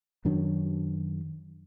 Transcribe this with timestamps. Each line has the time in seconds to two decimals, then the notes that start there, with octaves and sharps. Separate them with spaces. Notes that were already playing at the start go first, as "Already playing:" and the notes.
0.25 F#2 D#3 F#3 D4